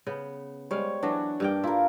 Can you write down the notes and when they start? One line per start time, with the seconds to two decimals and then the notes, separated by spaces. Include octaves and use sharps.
0.07 C#3 B3
0.71 G3 G#3 C#5 F5
1.03 E3 F#3 D4 F#4
1.40 G2 A#3 G5
1.64 E4 F4 A#4